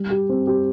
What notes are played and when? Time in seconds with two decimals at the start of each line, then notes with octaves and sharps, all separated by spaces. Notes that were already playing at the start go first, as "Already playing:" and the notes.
Already playing: G3
0.10 G4
0.29 C4
0.47 G4